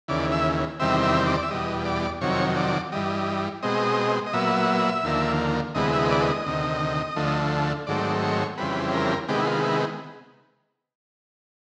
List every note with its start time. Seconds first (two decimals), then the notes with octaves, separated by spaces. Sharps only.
0.08 D#2 C#3 E3 D5
0.32 E5
0.80 E2 C3 D#3 G3 C4 E5
1.03 E5
1.26 D5
1.43 E5
1.50 E2 B2 G3 D#5
1.85 D5
2.21 F2 C3 D#3 F#3 C#5
2.57 D5
2.92 G2 E3 G3 D#5
3.62 B2 G#3 C4 D#5
4.26 D#5
4.33 A#2 F#3 B3 E5
5.04 D#2 D3 F3 A#3
5.75 D2 C3 E3 G#3 B3 D#5
5.93 E5
5.99 D#5
6.11 D5
6.22 D#5
6.46 D2 C3 D#3
7.16 D2 D3 F3 A3
7.87 G#2 D#3 F#3 A3 C4 D5
8.23 C#5
8.57 F2 C#3 E3 G3 C4 B4
8.94 A#4
9.28 C3 D#3 G#3 B3 G4
9.39 E4
9.46 F4
9.64 E4